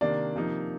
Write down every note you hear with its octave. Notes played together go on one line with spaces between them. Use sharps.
C3 D#3 A#3 D4 D5
C3 F3 A#3 D#4